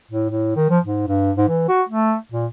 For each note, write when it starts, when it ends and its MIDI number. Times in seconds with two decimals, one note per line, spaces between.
0.11 0.29 45
0.30 0.56 45
0.56 0.66 51
0.70 0.79 53
0.85 1.07 44
1.08 1.32 43
1.37 1.47 44
1.49 1.65 52
1.69 1.83 66
1.89 2.15 57
2.32 2.47 46